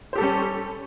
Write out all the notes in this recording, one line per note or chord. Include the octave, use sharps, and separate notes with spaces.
G3 C#4 G4 A4 C5